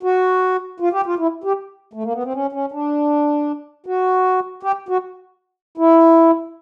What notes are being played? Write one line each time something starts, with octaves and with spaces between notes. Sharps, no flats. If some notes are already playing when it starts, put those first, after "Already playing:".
F#4
F4
G4
F4
E4
G4
A3
A#3
B3
C4
C#4
C#4
D4
F#4
G4
F#4
E4